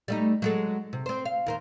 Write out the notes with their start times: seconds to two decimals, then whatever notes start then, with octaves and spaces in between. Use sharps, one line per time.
0.08 G3 A3 D#4
0.42 F#3 G#3 A4
0.93 C3
1.06 C4 C5
1.25 F5
1.46 D#2 A#4 C5